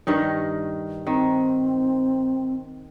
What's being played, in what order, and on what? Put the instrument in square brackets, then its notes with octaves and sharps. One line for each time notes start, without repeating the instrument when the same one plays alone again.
[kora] G2 D#3 D#4
[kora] D#3 [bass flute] C4